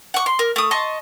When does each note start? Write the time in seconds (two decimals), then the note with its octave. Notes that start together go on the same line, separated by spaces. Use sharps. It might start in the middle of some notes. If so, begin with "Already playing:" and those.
0.14 F#5 C#6
0.26 C6
0.39 A#4
0.56 A3 D#6
0.71 D#5 A5 C6 C#6